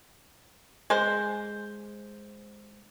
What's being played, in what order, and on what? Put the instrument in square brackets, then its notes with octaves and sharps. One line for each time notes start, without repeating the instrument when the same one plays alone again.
[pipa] G#3 C5